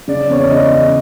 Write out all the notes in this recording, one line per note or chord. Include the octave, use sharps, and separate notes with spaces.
C#3 D5
E2 C#5
D5
C#3 D#5